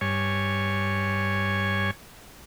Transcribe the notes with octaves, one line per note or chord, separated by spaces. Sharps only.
G2 C#5 G#5